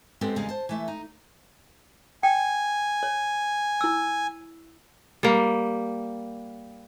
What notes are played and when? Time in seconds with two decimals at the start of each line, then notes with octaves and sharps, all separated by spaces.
0.21 G#3 B3 C4 G4 A4
0.36 E2 C#3 G3 G#3 F5
0.49 C5 A5
0.69 E3 A3 E5
0.88 D#4
2.23 G5 G#5
3.03 C#5
3.81 E4 E6
5.23 G3 A#3